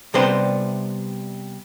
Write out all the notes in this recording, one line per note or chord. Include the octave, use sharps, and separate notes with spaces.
C3 G3 B3 D4 C5 C6